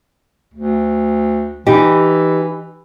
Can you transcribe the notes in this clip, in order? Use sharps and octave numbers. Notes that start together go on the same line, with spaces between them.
D2
E3 D#4 G4